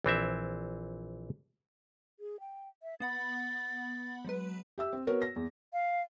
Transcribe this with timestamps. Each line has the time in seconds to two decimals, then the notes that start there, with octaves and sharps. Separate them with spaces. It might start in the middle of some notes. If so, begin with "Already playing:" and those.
0.04 A#1 E3 C4 E5
2.20 G#4
2.40 G5
2.83 E5
3.00 B3 F#5 B5 A6
4.25 F#3 G#3 B4
4.78 G4 E5 E6
4.93 C4
5.07 B3 F#4 A#4 B4 C#5
5.22 A#6
5.36 E2
5.73 F5